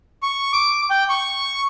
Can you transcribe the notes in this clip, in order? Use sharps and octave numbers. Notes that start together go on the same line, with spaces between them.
C#6
D6
G5
C#6